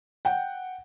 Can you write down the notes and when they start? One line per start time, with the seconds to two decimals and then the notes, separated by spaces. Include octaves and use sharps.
0.25 F#5 G5